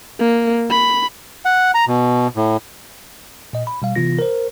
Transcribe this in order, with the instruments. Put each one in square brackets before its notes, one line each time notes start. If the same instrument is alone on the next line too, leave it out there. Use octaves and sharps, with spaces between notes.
[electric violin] A#3
B5
[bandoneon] F#5
A#5
B2
A2
[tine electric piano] A#2 D#5
B5
B2 G3 F5
C3 E3 B3 F4 A#6
A#4 C5